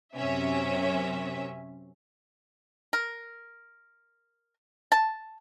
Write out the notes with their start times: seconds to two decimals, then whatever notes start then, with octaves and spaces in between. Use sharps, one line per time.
0.15 F#2 C3 C#4 E5
2.93 A#4
4.92 A5